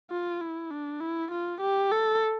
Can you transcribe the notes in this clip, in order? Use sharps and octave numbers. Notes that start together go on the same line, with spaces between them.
F4
E4
D4
E4
F4
G4
A4